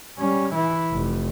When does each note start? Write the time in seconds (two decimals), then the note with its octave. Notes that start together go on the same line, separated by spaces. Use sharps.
0.19 G3 C#4
0.54 E3 E4
0.92 F1